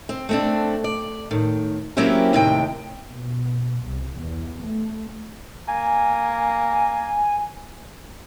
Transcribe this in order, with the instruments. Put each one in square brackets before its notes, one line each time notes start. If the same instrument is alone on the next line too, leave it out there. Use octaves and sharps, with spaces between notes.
[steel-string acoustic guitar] C4
A3 C4 D4
D5
A2 D#3
F#3 A#3 C4 C#4 E4 G4
D#2 A2 C3 D#3 F4 G5
[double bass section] B2
C2
E2
A3
[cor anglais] A#3 [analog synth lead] G#5